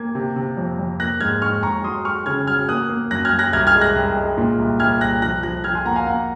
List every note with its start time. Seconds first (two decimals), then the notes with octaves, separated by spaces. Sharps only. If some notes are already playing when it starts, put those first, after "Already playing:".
Already playing: A#3 G#6
0.15 C3
0.36 C3
0.57 F2
0.79 F2
1.00 A#3 F#6 A#6
1.20 G#2 F6 G#6
1.42 G#2 C#6 F6
1.63 G#2 A#5 C#6
1.84 F#3 C6 D#6
2.05 F#3 C#6 F6
2.26 C#3 F6 G#6
2.47 F#3 F6 G#6
2.69 A#3 D#6 F#6
2.89 A#3
3.11 F#2 F#6 A#6
3.25 F6 G#6
3.32 F#2
3.39 F#6 A#6
3.53 C2 F6 G#6
3.67 F6 G#6
3.74 G#3
3.81 F#6 A#6
3.95 C2
4.17 G#3
4.37 A#2
4.59 C2
4.80 C2 F6 G#6
5.01 C2 F#6 A#6
5.22 F3 F#6 A#6
5.43 F3 F#6 A#6
5.64 F3 F6 G#6
5.75 G#5 C6
5.85 A#3 F#5 A#5
5.96 F5 G#5
6.07 A#3 F#5 A#5